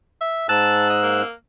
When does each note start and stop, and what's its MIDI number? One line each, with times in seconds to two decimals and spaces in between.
0.21 0.47 76
0.49 1.22 44
0.49 0.88 81
0.49 1.22 88
0.49 1.22 90
0.90 0.98 75
1.03 1.31 58